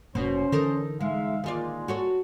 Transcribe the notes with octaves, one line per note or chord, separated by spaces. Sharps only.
F1 B2 A#3 C#4 C5
D3 E3 D#4 A4 A#4
G#3 D#4 E5 F5
A#2 D#3 G#3 F4 D5
F#4 A4 C#5